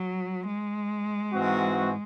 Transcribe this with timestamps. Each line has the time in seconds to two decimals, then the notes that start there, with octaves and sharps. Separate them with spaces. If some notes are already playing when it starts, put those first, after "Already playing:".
Already playing: F#3
0.47 G#3
1.32 G#2 E3 C4 F#4